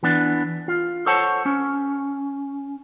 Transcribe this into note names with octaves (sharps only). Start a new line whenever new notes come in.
E3 B3 D4
F4
A4 C5 C#5 F#5 A5
C#4